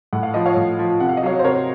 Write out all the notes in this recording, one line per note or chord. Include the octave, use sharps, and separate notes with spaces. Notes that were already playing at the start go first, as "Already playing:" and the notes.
A2 F#5
F5
F3 D#5
C#5 F5
A2
F3
C3 F#5
F5
D#5
F#3 C#5 F5
C5
C3 A#4 C#5